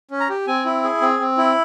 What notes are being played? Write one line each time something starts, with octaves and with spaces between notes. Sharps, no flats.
C#4
A#5
G4
C4 G#5
E4
G#4
C4
C4
E4